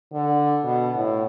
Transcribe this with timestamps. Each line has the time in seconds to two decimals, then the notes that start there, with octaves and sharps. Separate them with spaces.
0.13 D3
0.65 B2
0.95 A2